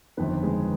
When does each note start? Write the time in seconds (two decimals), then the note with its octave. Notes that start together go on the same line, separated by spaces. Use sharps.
0.17 G1 F2 D#3 B3 B4
0.43 G#3 G#4